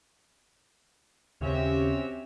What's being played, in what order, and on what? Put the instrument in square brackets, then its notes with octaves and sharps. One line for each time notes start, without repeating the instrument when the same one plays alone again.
[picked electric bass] D#2 C#3 [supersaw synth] C4 C#4 G4 [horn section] F#4 C#5 E5